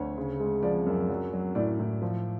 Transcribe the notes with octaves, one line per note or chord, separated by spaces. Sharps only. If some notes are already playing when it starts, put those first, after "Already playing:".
Already playing: D2 C#5
C#3
G#3
F3 D5
F#2
F#3
F#3
A2 D5
A2
F3